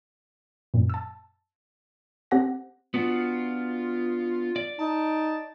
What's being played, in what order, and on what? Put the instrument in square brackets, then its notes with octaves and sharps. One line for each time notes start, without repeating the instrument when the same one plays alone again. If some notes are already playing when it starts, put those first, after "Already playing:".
[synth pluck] F#2 A#2
A5 E6
C4 G4 F#5 A#6
[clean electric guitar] B3 D4 F#4 [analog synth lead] F4
[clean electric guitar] D5
[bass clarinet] D#4 [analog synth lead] A5